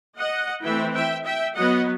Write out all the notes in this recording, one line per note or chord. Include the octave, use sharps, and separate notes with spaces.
D#5 F#5
E3 A3 C4 E5 G5
E5 G5
E5 G5
F#3 B3 D#5 F#5